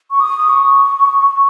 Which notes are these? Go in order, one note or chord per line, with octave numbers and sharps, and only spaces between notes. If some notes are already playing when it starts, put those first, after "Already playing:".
C#6
D#6
C#6